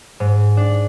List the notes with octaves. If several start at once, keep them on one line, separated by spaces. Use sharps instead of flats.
G#2
D4